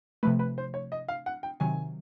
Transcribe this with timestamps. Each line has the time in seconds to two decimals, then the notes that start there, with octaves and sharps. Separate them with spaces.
0.23 C3 F3 A3 B4
0.39 B4
0.58 C5
0.74 C#5
0.92 D#5
1.08 F5
1.26 F#5
1.43 G5
1.60 C3 D#3 F#3 G#5